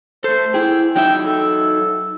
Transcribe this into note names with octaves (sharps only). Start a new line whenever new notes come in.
A3 A4 C5
E4 G#4 G5
F#3 D#4 E5 G5
A4